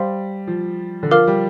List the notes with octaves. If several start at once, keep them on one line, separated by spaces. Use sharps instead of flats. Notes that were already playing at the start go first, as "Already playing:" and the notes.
Already playing: G3 C5 F5 C6
F3
D3
F3 A#4 F5 D6 F6
G3